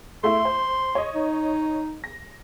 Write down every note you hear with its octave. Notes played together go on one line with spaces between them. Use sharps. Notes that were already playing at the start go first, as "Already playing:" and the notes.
A3 E4 E5 C6
C5
C#5 D#5
D#4
A#6